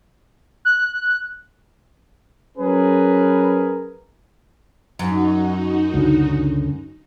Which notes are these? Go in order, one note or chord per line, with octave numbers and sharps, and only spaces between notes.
F#6
F#3 C#4 G#4 A#4 B4
F#2 D#4 F#4
C#2 D3